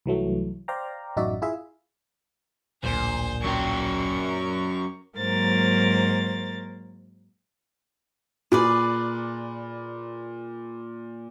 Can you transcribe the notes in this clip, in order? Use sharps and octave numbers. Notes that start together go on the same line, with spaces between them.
C2 E3 F#3 A3
C5 D5 F5 G5 A#5
A1 F#2 D#4 F#4 D5 E5
E4 F4 G#4 E5
D1 A#1 A#2 G#4 C5
F#3 C#4 A#4 G5 C#6
G#2 F#3 A#3 A#4 C5 A6
A#2 G#4 B4 D5